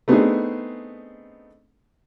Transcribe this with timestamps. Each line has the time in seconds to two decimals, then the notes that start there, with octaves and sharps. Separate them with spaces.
0.08 A3 B3 C4 D4 D#4 G#4